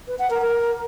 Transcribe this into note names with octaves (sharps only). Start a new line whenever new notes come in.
B4
F#5
A#4
A#4